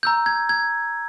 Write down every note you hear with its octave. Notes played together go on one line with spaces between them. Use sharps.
A#5 E6 G6
G#6
G#6